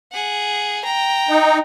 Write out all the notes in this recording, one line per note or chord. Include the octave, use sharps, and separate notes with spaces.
G#4 F#5
G5 A#5
D#4